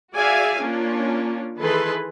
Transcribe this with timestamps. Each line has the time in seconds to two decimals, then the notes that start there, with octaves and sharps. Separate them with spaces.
0.15 F#4 G#4 D5 E5 F5 G#5
0.59 A#3 C#4 D4 F4
1.59 D#3 E3 G#4 A4 B4 C6